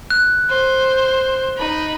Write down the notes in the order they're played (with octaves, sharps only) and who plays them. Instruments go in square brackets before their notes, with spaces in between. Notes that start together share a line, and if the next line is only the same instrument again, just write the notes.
[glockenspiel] F#6
[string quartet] C5
D#4 B5